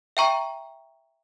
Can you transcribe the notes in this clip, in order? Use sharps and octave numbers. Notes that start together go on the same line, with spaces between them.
E5 G5 A#5 C#6